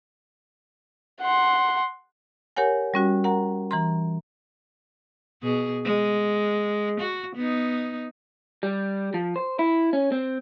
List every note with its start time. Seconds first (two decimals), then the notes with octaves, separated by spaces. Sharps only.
1.21 F#5 C6
2.56 G4 A#4 C#5 F#5 G#5
2.94 G3 C#4 F#4
3.24 A#4 F#5 A#5
3.71 E3 A#5 C6
5.43 B2 G#4
5.84 G#3
7.00 F#4
7.36 B3 D#4
8.63 G3
9.14 F3
9.36 C5
9.59 E4
9.93 C#4
10.12 C4